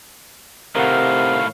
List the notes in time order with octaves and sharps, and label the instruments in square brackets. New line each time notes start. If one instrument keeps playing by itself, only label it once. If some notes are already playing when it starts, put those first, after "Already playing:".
[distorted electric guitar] A2 D#3 [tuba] C3 [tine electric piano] A#4 F#5 [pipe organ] F5